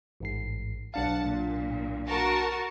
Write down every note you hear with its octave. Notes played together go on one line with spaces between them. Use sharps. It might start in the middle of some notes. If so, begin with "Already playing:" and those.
A1 G#2 C7
B1 D4 F5 F#5 A5
A#2
F#4 A#4 A5